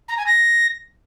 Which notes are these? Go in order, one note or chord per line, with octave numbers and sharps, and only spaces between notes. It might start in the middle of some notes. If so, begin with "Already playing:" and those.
A#5
G#5
A#6